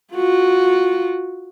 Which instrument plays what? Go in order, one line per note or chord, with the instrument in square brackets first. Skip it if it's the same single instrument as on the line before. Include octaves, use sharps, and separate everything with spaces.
[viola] F4 F#4